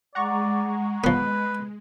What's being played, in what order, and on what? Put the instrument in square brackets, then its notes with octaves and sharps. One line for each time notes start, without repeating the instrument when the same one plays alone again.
[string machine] G#3 [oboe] D5 [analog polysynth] F#5 A#5 C#6
[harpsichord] F3 B3 [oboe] B4